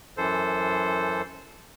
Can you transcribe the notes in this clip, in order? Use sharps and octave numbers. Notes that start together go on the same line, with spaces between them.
F#2 E3 A4 C5